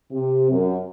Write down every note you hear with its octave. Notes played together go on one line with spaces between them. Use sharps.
C3
F#2